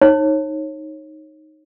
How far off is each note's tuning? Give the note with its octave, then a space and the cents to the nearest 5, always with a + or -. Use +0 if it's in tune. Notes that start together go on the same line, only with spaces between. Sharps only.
D#4 +0 C#5 -25